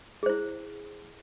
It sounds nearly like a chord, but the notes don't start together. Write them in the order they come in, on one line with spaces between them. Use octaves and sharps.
G#4 C5 E4